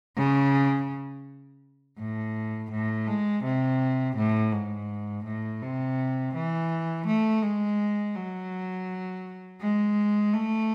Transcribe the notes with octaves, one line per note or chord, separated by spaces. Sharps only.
C#3
A2
A2
G#3
C3
A2
G#2
A2
C3
E3
A3
G#3
F#3
G#3
A3